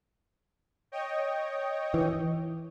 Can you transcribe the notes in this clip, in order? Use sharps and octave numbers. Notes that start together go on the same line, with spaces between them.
C#5 D#5 G5
E3